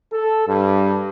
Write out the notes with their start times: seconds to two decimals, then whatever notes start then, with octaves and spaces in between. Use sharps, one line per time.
0.12 A4
0.46 G2